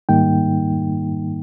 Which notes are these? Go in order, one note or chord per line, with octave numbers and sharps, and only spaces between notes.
G#2 D#3 G3 A#3 D#4 G5